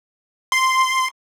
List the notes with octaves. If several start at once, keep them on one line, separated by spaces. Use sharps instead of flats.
C6